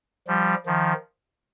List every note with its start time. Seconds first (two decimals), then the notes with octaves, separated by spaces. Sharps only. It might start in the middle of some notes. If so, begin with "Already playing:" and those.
0.27 F3 G3
0.66 D#3 F3